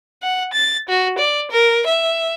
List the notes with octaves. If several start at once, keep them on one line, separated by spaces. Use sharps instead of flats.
F#5
A6
F#4
D5
A#4
E5